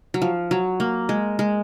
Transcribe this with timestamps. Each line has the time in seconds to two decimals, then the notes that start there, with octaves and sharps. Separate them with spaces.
0.14 F#3
0.22 F3
0.51 F#3
0.80 A#3
1.09 G#3
1.39 G#3